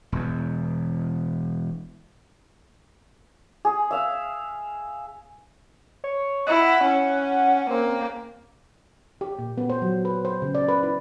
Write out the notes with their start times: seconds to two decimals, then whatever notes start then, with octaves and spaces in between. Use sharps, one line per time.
0.12 E1 E2
3.65 G#4
3.91 E5 F5
6.04 C#5
6.47 E4 F#5
6.84 C#4
7.70 A#3 C4
9.21 G4
9.39 A#2
9.58 B3
9.70 C5
9.82 F#3
10.05 B4
10.25 C5
10.42 C#3
10.55 D5
10.69 B4
10.83 E4